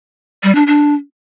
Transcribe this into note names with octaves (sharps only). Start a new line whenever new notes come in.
G3
D4
D4